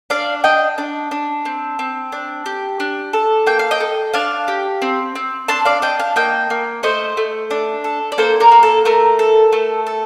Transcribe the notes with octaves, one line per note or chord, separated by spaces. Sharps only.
D4 D5 F5
D4 D#5 G5
D4
D4
C4
C4
D4
G4
D4
A4
A#3 G5
F5
D#5 G5
A4
D4 F5 A5
G4
C4
C4
D4 A5 C6
D5 F5
D4 D#5 G5
F5 A5
A#3 D#5 G5
A#3
A3 C5 D#5
A3
D4
A4
D5
A#3 A4 C5
A#4 D5
A#3
A4
A3 A#4
A4
A3
A4